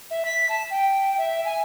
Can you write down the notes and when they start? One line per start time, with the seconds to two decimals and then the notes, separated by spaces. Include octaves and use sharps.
0.11 E5
0.25 B6
0.49 A5
0.70 G5
1.18 E5
1.45 G#5